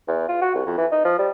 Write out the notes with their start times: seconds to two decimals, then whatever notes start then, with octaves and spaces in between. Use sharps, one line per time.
0.08 E2
0.28 F4
0.42 F#4
0.55 C2
0.66 F2
0.78 E3
0.92 D#4
1.04 F3
1.19 G3